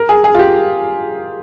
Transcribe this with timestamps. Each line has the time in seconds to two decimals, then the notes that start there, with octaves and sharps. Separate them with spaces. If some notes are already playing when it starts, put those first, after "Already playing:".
Already playing: A#4
0.09 G#4
0.24 G#4
0.34 F4
0.39 G4